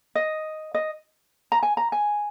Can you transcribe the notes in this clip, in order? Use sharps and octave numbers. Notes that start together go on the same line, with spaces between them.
D#5
D#5
A#5
G#5
A#5
G#5